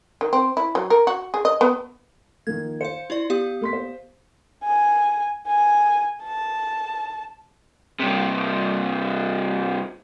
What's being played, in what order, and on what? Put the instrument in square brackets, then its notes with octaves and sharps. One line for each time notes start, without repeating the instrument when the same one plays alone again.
[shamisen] D#3
C4
E4
F#3
A#4
F#4
G#4
D#5
B3
[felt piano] D#3 F3 A#3 [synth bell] G#6
[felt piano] C5 [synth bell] F5 C#7
[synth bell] E4 F4 D5
B3 G4 F5
[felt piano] A#3 C6 B6
C5
[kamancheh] G#5
G#5
A5
[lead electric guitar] G2 C3